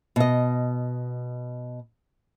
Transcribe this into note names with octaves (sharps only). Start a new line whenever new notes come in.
B2 D#5